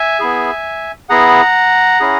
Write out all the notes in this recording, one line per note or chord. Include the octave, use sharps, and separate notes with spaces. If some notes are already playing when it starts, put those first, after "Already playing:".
Already playing: E5 G#5
B3 E4 G#4
B3 E4 G#4 F#5 A#5
C#4 E4 G#4